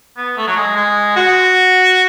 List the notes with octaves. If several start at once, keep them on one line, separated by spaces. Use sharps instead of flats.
B3
A3
F#3
G#3
G#3
F#4